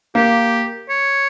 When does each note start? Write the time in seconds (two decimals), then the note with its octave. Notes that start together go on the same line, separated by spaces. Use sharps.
0.15 A#3 G4
0.89 C#5